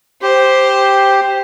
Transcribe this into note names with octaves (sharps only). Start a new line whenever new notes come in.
G4 C5